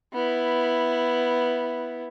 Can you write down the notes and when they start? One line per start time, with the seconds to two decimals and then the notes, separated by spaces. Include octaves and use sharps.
0.13 B3 E4